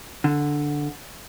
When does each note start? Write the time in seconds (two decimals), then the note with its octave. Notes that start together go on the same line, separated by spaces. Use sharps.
0.24 D3